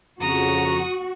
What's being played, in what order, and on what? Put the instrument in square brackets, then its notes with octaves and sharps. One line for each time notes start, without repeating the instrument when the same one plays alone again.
[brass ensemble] F2 C#3 [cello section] F#4 [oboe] A#5 [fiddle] D#6